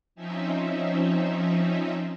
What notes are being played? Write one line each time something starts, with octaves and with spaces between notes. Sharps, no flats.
F3 C4 C#4 D#4 E5